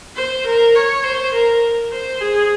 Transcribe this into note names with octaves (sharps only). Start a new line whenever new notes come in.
C5
A#4
C#5
C5
A#4
C5
G#4